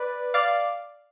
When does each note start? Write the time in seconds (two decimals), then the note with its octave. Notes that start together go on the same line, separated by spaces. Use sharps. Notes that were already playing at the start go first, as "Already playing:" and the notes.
Already playing: B4 D5
0.34 D5 F5